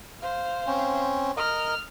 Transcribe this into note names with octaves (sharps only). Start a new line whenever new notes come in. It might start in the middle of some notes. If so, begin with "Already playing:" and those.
C5 F5
C4 C#4
A#4 D#5 F6